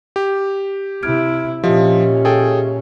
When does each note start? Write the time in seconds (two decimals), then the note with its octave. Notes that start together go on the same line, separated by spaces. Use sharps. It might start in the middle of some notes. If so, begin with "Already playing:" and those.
0.16 G4
1.03 C3 E4 F6 G#6 D7
1.64 A#2 F3 C#4 G4 D#5 E5
2.25 G#4 A4 G5